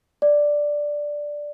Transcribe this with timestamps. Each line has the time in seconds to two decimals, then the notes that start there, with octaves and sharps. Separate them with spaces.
0.22 D5